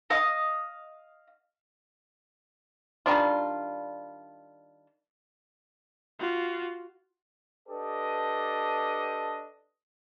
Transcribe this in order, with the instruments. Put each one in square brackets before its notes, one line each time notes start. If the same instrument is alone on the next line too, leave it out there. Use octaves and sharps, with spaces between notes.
[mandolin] D#5 F5 D#6
[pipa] D#3 G3 D4 F4
[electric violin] F4 F#4
[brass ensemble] D4 G4 A4 B4 D5 D#5